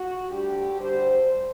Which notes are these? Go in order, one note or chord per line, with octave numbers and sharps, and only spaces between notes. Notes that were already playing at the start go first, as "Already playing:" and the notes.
Already playing: F#4
D2 D3 G3 G4
D2 D3 G3 C5